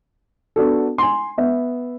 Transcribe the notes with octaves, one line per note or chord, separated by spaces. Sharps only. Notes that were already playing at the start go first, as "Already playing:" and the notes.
B3 D4 F#4 A4
G#5 C6
B3 E5